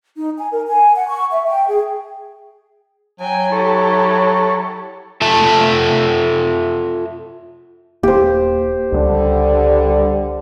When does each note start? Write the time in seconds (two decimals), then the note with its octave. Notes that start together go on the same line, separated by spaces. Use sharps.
0.16 D#4
0.38 G#5
0.52 A#4
0.67 G#5
0.95 F#5
1.08 C#6
1.32 E5
1.47 G5
1.68 G#4
3.20 F#3 G5 G#5
3.52 E4 G4 A4 C#5
5.22 F4 A4 E5 A5
8.03 D#1 A#3 G4 C5
8.92 C#2 D3 G3 G#3 D4